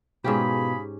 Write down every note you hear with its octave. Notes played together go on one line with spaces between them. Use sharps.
G#2 B2 C#4 F4 G4 G#4 B5